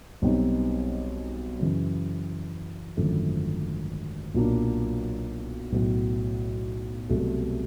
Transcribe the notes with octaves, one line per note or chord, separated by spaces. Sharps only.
B1 B2 G3 C4 D#4
F#2 C#3 E3
G#1 F#2 D3 F3 A3
B1 A#2 F#3 A#3 D4
B1 A2 F#3
C2 B2 F#3 A3